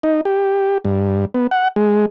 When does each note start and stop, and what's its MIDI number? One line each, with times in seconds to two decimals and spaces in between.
0.03 0.21 63
0.25 0.78 67
0.85 1.25 43
1.34 1.47 59
1.51 1.68 78
1.76 2.06 56